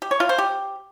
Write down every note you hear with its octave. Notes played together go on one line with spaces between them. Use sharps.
G4
C#5
F4
C5
G4